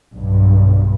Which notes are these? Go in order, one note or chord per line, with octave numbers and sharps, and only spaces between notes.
B1 G2